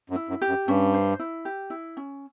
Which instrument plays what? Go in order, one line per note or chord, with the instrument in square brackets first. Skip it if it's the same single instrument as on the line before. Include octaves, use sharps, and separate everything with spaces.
[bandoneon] F#2
[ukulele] E4
[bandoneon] F#2
[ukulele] G4
[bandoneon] F#2
[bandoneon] G2 [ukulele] C#4
[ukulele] C5
E4
G4
E4
C#4